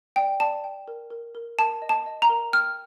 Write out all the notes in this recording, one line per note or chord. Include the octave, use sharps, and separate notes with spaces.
D5 G5
D5 A5
G5
A#4
A#4
A#4
A#4 A5
D#5
A5
D#5
A#5
A#4
G5 F6